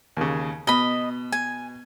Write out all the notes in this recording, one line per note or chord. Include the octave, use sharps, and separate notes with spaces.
D#2 C#3
B2 D#5 B5
G#5